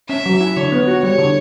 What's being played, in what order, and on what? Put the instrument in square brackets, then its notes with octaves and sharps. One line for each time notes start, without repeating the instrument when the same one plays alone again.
[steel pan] C#4 [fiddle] E5
[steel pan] F#3
E4
[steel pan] D3 [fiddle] C#5
[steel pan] B3
F#4
[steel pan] G3 [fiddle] C#5
[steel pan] D3